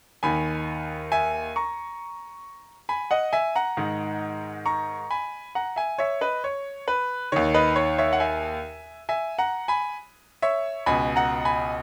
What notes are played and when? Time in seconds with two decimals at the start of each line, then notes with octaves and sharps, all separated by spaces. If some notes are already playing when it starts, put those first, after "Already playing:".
0.23 D#2 D#3 G#5 B5
1.12 E5 G#5
1.56 A#5 C#6
2.89 G#5 B5
3.11 D#5 F#5
3.33 E5 G#5
3.56 F#5 A#5
3.77 G#2 D#3
4.66 A#5 C#6
5.10 G#5 B5
5.55 F#5 A#5
5.76 E5 G#5
5.98 C#5 E5
6.21 B4 D#5
6.44 C#5
6.88 B4
7.32 D#2 D#3 C#5
7.54 B4 D#5
7.76 C#5
7.98 C#5 E5
8.13 F#5
8.20 E5 G#5
9.09 E5 G#5
9.39 F#5 A#5
9.68 G#5 B5
10.42 C#5 E5
10.86 C#2 B2 G#5 B5
11.16 F#5 A#5
11.45 G#5 B5